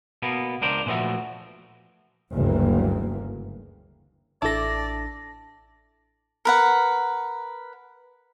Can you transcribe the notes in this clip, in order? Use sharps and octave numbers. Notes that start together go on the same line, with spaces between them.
B2 A#3 B3
C#2 D4 A#4 C5
A#2 E3 F3 A3 F#4
F#1 D2 G2 E3 A#3
A1 D4 E4 A4 D5 A5 D6 A#6
A#4 B4 F#5